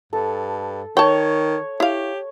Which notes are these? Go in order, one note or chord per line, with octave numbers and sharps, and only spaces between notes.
G2 A4
D#3 C#5 G5 A5
E4 G4 F5